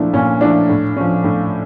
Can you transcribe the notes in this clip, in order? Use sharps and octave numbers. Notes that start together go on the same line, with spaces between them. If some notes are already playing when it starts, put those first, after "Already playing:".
Already playing: A#2 F3 A3 D4 E4
A#2 C#4
F3 A3 D4 E4
A2
F3 C#4
A2